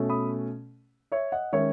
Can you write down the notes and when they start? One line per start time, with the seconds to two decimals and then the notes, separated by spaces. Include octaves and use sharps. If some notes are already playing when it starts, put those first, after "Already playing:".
Already playing: B2 A3 C#4
0.09 B5 D#6
1.12 C#5 E5
1.32 D#5 F#5
1.53 D#3 G#3 C#4 C#5 E5